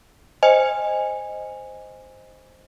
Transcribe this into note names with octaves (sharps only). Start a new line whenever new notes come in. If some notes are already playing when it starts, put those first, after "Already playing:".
C5 D#5 G#5